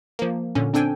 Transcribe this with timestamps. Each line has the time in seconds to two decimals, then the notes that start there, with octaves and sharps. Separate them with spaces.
0.19 F3 A#3
0.55 A#2 D3 C#4
0.74 C4 D4 A4 G5 G#5